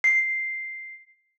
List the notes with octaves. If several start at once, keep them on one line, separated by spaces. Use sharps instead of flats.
C7